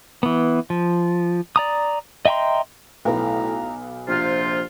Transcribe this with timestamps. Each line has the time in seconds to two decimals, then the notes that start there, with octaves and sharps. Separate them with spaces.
0.23 E3 B3
0.70 F3
1.56 D5 A#5 D#6
2.25 D#5 E5 G5 A#5 C6
3.05 B1 A2 B3 A#5
4.08 A#1 C3 F4 C5